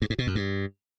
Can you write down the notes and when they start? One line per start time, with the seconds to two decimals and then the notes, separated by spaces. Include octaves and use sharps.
0.02 G2
0.10 G#2
0.19 B2
0.27 F#2
0.35 G2